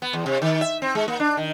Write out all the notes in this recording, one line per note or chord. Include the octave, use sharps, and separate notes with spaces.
B3
E2
C3
D#3
E5
C4
G#3
A#3
D4
D#3